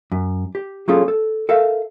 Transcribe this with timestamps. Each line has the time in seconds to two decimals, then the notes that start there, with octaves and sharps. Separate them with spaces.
0.12 F#2
0.55 G4
0.88 F#3 A#3 C#4 F4 G#4 A4
1.08 A4
1.49 A4 A#4 E5 F5